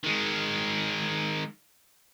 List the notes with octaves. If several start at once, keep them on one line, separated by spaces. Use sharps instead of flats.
D#3 G#3